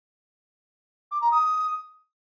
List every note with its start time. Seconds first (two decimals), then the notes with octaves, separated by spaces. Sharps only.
1.11 D6
1.21 A#5
1.32 D#6